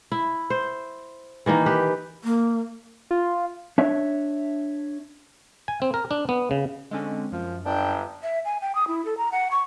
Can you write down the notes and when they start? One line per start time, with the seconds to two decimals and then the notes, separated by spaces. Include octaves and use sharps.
0.12 E4
0.50 C5
1.46 D#3 E3 A#3 D#4
1.66 G4 B4
2.24 A#3
3.11 F4
3.78 D4 C#5 E5
5.68 G#5
5.82 C4
5.94 A#4
6.11 D4
6.29 B3
6.51 C#3
6.91 D3 G#3 C4 C#4
7.32 F#2 F3
7.65 G1 D4 G5
8.23 E5
8.45 G#5
8.62 G5
8.75 D#6
8.88 E4
9.05 A4
9.18 A#5
9.32 F#5
9.51 C#6